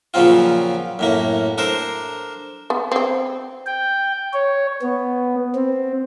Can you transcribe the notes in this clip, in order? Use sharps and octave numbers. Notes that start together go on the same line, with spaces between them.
A#2 C#3 F3 F#3 C4 F4
F#2 A2 A#3
D4 A4 A#4 C5
B3
C4 G5
G5
C#5
B3
C4